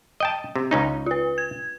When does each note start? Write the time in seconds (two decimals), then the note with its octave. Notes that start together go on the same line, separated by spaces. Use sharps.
0.20 D#5 G5 A5
0.55 C3
0.71 C#2 C#4 D#4
1.06 F4 B4
1.38 G#6